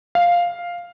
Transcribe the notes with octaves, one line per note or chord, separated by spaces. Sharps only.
F5